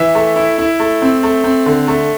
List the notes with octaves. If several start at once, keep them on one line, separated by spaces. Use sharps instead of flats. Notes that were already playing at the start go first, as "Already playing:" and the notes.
Already playing: E3 E5
A3
E4
E4
A3
C4
A3
C4
D3
A3